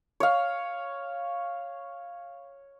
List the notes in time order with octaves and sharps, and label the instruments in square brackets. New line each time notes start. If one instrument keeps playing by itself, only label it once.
[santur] C#5 F5